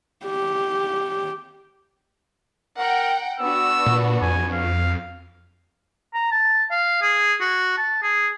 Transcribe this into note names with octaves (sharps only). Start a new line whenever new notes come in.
G4
A#4 F#5 G5
B3 D4 F#4 E6
A#2
F2 G#5
F5
A#5
A5
F5
G#4
F#4
A5
G#4